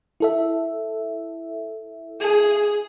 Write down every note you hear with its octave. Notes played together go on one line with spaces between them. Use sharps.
E4 A4 E5
G#4